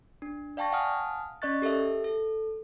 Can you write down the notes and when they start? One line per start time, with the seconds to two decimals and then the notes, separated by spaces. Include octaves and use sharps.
0.22 D4
0.57 D5 F5 G5 A5 C#6 A#6
0.72 F5 F#5 G#5 A5 D#6 F6
1.42 C#4 D5 D#5 C#6 F#6 A6
1.62 G4 A4 A#4 E5
2.04 A4